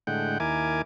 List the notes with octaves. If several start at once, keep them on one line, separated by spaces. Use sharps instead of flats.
A2 D3 G#3 F#5 G5
D#2 E4 A#4 G#5 D6